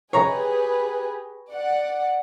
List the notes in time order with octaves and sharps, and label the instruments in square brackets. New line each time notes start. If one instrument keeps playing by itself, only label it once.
[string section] G4 G#4 B4 [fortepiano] C#5 A#5
[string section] D5 F#5